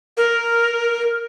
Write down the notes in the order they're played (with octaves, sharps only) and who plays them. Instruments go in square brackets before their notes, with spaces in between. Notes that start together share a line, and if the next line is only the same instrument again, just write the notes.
[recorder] A#4